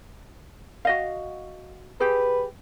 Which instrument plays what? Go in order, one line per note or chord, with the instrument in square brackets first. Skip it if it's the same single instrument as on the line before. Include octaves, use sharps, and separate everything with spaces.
[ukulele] F#4 D#5 F5
[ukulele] G4 G#4 [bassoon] B4